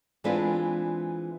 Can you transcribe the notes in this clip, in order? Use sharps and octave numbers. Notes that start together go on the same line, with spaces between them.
E3 G#3 C4 D4 F4 B4